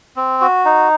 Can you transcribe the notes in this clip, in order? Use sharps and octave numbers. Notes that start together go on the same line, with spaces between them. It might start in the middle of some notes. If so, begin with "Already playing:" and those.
C4
F#4
D#4